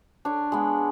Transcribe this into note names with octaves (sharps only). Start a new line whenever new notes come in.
D4 C#5
G#3 B3